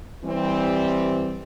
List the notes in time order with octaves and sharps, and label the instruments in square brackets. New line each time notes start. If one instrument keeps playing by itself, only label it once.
[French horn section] E3 G3 C4